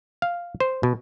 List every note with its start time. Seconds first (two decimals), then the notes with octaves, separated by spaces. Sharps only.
0.22 F5
0.60 C5
0.83 B2